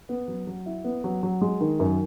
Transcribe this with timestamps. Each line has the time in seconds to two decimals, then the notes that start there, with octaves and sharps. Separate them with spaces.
0.09 B3
0.28 F#3
0.47 F#3
0.66 E4
0.84 B3
1.04 F#3
1.23 F#3
1.41 G#3
1.61 D#3
1.80 F#2